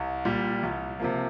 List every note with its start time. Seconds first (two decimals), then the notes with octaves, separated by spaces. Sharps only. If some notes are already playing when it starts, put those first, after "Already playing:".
Already playing: C2
0.25 A#2 G3
0.63 C2
1.00 C3 F3 A#3